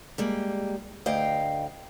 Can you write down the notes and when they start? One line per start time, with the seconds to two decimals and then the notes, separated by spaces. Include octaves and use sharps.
0.18 G3 G#3 A#3
1.06 D2 D#5 F5 G5